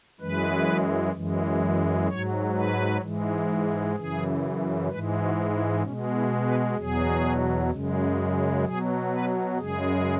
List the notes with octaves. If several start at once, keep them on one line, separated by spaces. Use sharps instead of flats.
F#2 E3 G#3 B4
F#2 E3 G#3
G#2 F#3 C#5
B4
G#2 E3 G#3
F#2 C#3 E3 G#4
G#2 E3 G#3 B4
F#4
E4
B2 G#3 C#4
E4
B4
E2 B2 F#3 G#4
F#2 C#3 G#3
B2 F#3 G#4
B4
F#2 C#3 G#3 G#4